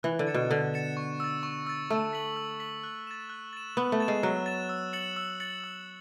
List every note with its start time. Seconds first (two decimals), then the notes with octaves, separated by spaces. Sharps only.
0.03 E3 F#6
0.19 D3
0.27 A6 C#7 E7
0.34 B2
0.50 D3 F#6
0.74 A6 C#7 E7
0.97 C#6
1.20 E6 A6
1.43 C#6
1.67 E6 A6
1.90 A3 E6
2.13 B6 F#7
2.37 E6
2.60 B6 F#7
2.83 F#6
3.07 A6 E7
3.30 F#6
3.53 A6 E7
3.77 B3 F#6
3.92 A3
4.00 A6 E7
4.08 G#3
4.23 F#3 F#6
4.46 A6 E7
4.69 E6
4.93 A6 C#7 F#7
5.16 E6
5.40 A6 C#7 F#7
5.64 E6